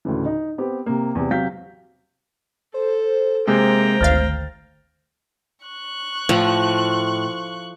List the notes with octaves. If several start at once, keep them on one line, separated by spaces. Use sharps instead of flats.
D2 A2 C#3 E3
D#4
B3 C4 G4
C3 A#3
E2 C3
C3 F#3 F5 G6 B6
A4 C5
C3 G#3 A#3 G5 A#5
G#1 D2 F5 F6 A6
C#6 F#6
A2 F3